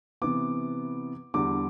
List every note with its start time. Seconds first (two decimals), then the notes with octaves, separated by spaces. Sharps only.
0.22 C3 E3 B3 D6
1.34 E2 D3 G3 D6